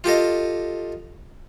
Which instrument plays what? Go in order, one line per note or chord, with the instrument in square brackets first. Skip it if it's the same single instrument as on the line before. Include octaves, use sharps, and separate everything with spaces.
[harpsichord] F4 G4 A4 D#5